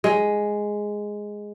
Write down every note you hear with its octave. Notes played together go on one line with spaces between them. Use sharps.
G#3